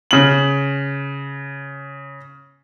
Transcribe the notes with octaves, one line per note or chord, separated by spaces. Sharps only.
C#3 F#7